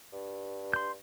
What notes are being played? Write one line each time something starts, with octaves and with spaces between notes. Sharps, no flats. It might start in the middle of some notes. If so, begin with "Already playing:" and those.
G2
C6 G6